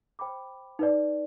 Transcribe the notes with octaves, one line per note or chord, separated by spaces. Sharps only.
C5 G5 B5 D6
D#4 B4 D5